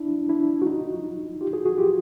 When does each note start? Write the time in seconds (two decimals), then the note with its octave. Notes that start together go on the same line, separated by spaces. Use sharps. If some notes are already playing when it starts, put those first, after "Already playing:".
Already playing: D4 E4
0.29 D4 E4
0.62 F#4
0.67 D#4 F4
1.41 F4 G4
1.53 F#4 G#4
1.66 F#4 G#4
1.78 F4 G4